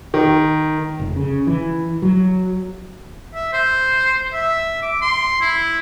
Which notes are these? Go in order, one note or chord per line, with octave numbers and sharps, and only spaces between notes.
D#3
F1
C#3
E3
F#3
E5
C5
E5
D6
C6
E4